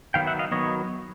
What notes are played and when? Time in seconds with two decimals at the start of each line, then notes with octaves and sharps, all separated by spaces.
0.14 D#3 F#3 B3 F5 G5
0.27 E5 F#5
0.39 D#5 F5
0.52 D#3 F#3 B3 C#5 D#5